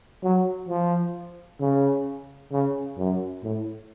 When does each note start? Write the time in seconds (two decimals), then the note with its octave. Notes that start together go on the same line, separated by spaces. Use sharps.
0.23 F#3
0.69 F3
1.60 C#3
2.52 C#3
2.98 F#2
3.44 A2